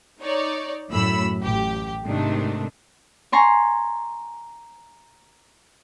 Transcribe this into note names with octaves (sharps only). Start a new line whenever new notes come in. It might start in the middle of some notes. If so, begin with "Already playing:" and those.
D#4 C#5 D5
F#2 A2 B5 E6
A1 G4
G#2 C3 D#3 A3 D4
G#5 A#5 C6 C#6